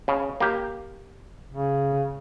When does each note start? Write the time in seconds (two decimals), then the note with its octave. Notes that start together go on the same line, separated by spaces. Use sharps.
0.08 C#3
0.40 A#3 G4
1.51 C#3